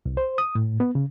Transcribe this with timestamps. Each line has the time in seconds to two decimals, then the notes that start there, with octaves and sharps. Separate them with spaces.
0.06 C2
0.17 C5
0.38 D#6
0.55 A2
0.80 B3
0.95 C#3